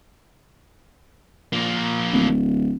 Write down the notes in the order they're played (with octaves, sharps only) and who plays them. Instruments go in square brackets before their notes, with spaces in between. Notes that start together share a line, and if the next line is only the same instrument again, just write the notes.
[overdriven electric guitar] F3 A#3
[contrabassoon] D1